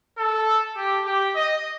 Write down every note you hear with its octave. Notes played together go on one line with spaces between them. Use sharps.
A4
G4
G4
D#5